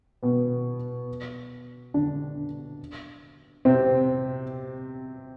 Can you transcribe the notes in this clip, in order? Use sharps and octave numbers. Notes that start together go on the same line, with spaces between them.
B2 B3
D3 D4
C3 C4